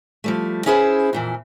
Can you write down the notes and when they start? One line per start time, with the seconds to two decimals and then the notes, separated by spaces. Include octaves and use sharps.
0.24 F3 G3 A3
0.66 C#4 E4 G#4 B4 C5
1.13 F2 A#2 E3